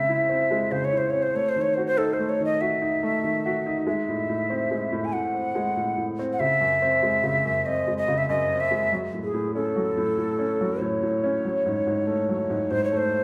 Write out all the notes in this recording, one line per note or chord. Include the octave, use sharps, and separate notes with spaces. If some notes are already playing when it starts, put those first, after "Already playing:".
Already playing: C#3 G#3 C4 E5
E4
C4
G#3
C#3 C5
C#5
E4 C5
C4 C#5
C5
A3 C#5
C5
D#3
C#5
F#4 C5
C5
D#4 A4
C5
A3
C#5
D#3 D#5
F#4 E5
D#4
A3
D#3
F#4
D#4
G#3 E5
A2
A2
C4
G#3
A2
G#5
A2 F#5
C4
G#3
A2
A2
C4
F#5
C#3 E5
F#2
C4
G#3
C#3
F#2
C4 D#5
G#3
D#5
C#3
E5
F#2 D#5
C4
E5
G#3
F#3
A2
G#4
A2
C#4 A4
F#3
A2
A2
C#4
F#3
A2 C#5
A2
C#4
F#3
G#2
G#2
A3
F#3
G#2
G#2 C5
C#5
A3 C5